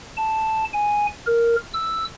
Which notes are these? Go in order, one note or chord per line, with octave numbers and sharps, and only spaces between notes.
A5
G#5
A#4
E6